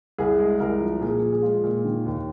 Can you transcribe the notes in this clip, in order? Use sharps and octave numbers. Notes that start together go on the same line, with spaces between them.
C2 G#4
G#3
C2 A#4
F3
A#2 G#4
F3
G#4
G#3 F4
A#2
D#3
D#2